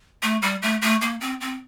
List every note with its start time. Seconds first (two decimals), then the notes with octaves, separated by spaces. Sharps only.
0.23 A3
0.42 G3
0.62 A3
0.82 A3
1.01 A#3
1.20 C4
1.41 C4